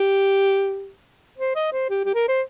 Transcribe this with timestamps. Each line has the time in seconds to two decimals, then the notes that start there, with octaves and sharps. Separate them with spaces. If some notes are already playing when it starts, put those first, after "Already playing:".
Already playing: G4
1.38 C5
1.56 D#5
1.73 C5
1.90 G4
2.05 G4
2.15 A#4
2.28 C5